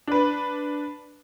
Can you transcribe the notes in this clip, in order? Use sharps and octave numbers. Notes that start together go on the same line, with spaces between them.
D4 B4